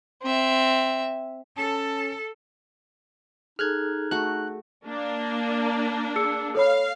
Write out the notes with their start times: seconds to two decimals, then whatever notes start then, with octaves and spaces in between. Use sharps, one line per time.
0.23 C4 E5
1.57 C#4 A4 A5
3.59 D#4 G#4 A4 F6 F#6 G#6
4.11 A3 F#4 F#6
4.86 A#3 D4
6.16 G#4 E6 C#7
6.55 A4 C#5 F5 B5